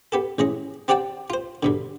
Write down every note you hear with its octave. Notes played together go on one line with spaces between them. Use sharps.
B3 G4 A4
A1 G#3 C#4 D#5
C4 G4 D5 F#5 G5 A5
F4 C5
G2 B2 D3